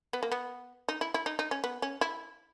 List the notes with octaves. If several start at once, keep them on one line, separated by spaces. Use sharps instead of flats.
B3
A#3
B3
D#4
E4
E4
D#4
D#4
C#4
B3
C#4
E4